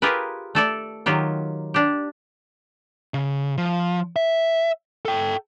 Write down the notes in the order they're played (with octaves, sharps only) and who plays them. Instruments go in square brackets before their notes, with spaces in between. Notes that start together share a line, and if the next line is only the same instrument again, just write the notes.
[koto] F4 G4 G#4 A#4 B4
A3 A4 D5
D#3 F#3 F4 G4
D4 G4
[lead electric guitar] C#3
F3
E5
A4 G5